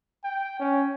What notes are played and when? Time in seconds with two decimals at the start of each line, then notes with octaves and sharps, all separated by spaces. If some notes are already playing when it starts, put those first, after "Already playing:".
0.24 G5
0.59 C#4